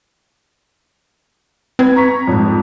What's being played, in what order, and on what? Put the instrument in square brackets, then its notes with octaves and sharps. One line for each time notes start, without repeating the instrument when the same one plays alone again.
[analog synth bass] C4 [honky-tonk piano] B4 G#6
[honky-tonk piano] A#5 C#6 B6
F2 G#2